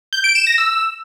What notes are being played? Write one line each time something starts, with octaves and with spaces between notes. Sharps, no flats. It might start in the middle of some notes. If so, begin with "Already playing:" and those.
G6
D7
E7
A#6
E6